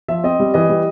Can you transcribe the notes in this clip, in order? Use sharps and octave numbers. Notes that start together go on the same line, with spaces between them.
F3 E5
C4 D#5
G3
E3 D#5
G3